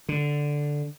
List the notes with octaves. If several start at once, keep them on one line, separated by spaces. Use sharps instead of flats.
D3